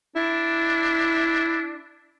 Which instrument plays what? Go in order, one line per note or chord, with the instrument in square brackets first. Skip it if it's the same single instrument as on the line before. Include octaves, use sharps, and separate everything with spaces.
[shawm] D4 [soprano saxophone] E4